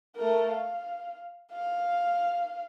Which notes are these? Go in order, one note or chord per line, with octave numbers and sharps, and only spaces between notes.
A3 A#4
F5
F5